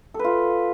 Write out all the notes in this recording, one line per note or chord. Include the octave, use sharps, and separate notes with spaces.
F4 A4 B4